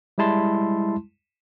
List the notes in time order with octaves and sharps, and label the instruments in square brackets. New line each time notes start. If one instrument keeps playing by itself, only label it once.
[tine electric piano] G3 G#3 E4 A5 C6